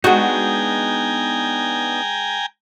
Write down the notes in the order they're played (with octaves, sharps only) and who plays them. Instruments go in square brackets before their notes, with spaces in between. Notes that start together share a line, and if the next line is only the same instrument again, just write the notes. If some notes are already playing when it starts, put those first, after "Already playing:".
[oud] G#3 F#4 [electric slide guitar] B3 D4 D#4 [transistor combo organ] G5 G#5 A#5